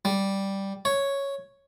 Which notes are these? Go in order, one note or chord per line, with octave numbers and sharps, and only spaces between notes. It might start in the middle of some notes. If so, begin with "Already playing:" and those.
G3
C#5